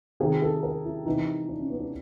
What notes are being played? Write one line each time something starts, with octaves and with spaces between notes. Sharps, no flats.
C3 D#3 G#4
A4
A#4
E4
C3 E3 D#4
D4
C#4
B3
D4